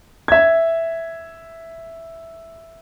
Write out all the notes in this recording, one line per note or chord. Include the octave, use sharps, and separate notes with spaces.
E5 G#6